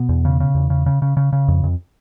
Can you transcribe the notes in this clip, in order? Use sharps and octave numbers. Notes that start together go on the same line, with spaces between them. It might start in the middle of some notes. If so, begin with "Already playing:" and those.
Already playing: B2 B3
E2
C#3
C#3
E2
C#3
C#3
C#3
C#3
C#3
F2
F2